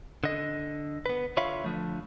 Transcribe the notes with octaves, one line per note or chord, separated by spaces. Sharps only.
D3 D#5
B3 B4
D3 F4 C#5 E5 F5 B5
D3 F3 A3